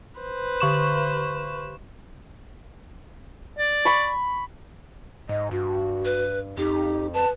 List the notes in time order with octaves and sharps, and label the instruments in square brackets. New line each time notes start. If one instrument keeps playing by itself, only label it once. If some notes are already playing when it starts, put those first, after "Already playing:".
[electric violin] B4 C5
[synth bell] D3 C#6 E7
[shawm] D5
[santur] B5 C#6
[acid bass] G#2 [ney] D#5
[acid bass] G2 [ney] F#4
[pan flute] B4
[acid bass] F2 [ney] D#4 [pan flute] G4
[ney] B4 [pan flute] A5